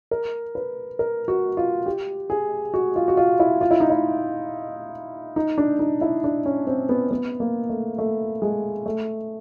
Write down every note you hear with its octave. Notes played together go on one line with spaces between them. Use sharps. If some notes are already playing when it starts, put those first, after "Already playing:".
A#4
B4
A#4
F#4
F4
G4
G#4
F#4
F4
F#4
F4
E4
F4
E4
D#4
E4
D#4
D4
D#4
E4
D4
C#4
C4
B3
B3
A#3
A3
A3
G#3
A3